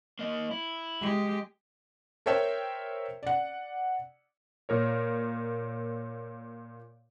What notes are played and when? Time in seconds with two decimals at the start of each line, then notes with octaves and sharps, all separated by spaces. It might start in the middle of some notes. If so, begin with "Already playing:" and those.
0.19 A#3 D#5
0.51 E4
1.00 G#3 G4
2.26 A#4 C5 C#5 E5 G5
3.23 D5 F#5
4.69 A#2 A#4 C#5